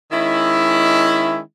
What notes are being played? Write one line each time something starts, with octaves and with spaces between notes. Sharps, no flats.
D#3 G#3 C#4 E4